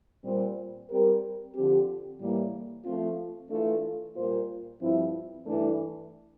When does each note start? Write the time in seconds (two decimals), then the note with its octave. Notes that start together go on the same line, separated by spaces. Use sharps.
0.24 A#2 G3 C4
0.89 G3 C4 G4 A#4
1.54 D3 F3 C4 G4
2.20 A2 E3 G3 A#3
2.85 F3 A3 C4 F4
3.50 E3 A3 D4 F4 A4
4.15 A#2 G3 A#3 F4 C5
4.80 G2 F3 C4 E4
5.46 G2 E3 A3 D4